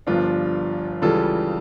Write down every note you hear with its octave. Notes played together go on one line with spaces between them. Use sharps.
G1 G2 F3 D4 F4
C#2 C#3 E3 G3 F4 A4